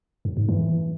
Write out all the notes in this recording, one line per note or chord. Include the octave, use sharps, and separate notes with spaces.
F#2
G#2
E3